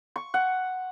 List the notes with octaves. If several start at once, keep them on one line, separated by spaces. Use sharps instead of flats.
C#6
F#5